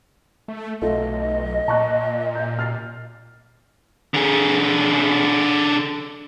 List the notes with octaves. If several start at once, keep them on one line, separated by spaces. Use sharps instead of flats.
A3
B1 A3 F4 D#5
A#2 A5 C#6 F#6
G6
F6 A6 C7
D3 G#4